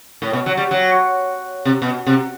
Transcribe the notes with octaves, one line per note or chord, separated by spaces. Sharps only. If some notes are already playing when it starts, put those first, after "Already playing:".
A2
B2
F#3
G3
F#3
C3
B2
C3